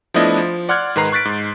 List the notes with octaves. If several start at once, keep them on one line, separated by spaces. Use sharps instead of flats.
F3 A3 B3 D4 E4 D#5
F3
D5 F#5 C6 F6 F#6 G#6
G#2 D#3 B4 A#5 C7
C#6 F#6 A6 B6 D7
G#2